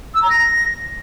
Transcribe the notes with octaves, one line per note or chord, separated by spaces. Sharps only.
E6
A#5
A#6